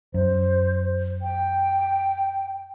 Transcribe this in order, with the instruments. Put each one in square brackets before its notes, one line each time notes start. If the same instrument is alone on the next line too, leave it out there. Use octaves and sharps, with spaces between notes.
[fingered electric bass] F#2 [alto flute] C5
[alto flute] G5